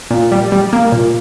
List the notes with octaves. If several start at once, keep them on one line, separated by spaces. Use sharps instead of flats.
A#2
G3
G3
A#3
A#2